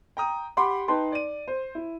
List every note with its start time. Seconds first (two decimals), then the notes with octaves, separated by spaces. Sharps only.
0.17 G5 A#5 D#6
0.57 G4 F#5 B5 C6 D6
0.88 D#4 B4 G5 A5 C6
1.12 D5 D#7
1.48 C5
1.75 E4